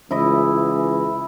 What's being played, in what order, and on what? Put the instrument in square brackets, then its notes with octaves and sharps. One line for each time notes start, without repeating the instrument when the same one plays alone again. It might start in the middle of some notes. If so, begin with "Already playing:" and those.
[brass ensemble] C#2 E3 [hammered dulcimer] E4 D#5